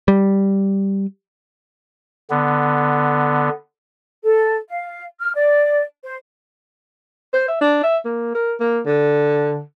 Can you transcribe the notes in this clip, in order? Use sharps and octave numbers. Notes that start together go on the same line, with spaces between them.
G3
D3 B3
A4
F5
F6
D5
C5
C5
E5
D4
E5
A#3
A#4
A#3
D3